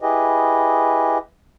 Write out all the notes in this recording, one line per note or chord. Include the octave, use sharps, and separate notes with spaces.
E4 G4 G#4 B4 D#5